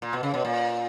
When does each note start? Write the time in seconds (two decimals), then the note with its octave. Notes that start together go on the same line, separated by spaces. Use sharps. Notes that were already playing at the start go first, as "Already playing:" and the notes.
0.02 A#2
0.13 B2
0.23 C#3
0.34 B2
0.45 A#2